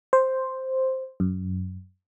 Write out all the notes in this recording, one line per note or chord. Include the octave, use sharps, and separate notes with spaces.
C5
F#2